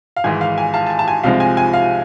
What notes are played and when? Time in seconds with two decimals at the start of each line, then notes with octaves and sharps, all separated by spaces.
0.16 F5
0.24 G#1 G#2 E3 G#5
0.41 F5
0.58 G#5
0.74 F5 A5
0.87 A5
0.90 G#5
0.99 A5
1.08 G#5
1.23 C2 C3 F3 G#3 C4 F5
1.40 G#5
1.57 G#5
1.73 F5